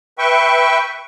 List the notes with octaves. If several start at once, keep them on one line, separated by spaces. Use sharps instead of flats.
B4 E5 G5 C#6